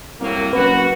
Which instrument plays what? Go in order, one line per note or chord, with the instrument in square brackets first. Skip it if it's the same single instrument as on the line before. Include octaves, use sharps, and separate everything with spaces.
[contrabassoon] C2 [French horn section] A2 F#3 A#3
[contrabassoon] F#1 [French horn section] F#4 [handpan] B4